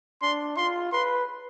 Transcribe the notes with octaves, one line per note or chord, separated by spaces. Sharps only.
D4 C6
F4 C6
B4 C6